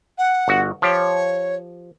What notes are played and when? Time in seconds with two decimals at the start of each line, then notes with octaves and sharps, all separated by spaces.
0.18 F#5
0.48 G1 F#4
0.82 F3 G4 C#5